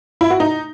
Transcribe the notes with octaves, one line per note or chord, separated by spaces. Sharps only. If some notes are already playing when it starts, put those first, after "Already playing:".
E4
F#4
D#4